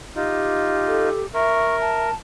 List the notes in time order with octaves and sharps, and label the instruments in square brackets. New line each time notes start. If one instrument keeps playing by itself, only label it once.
[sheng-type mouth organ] D#4 F4 [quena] G4
[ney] A4
[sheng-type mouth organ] A#4 [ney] E5 [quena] C#6
[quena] A5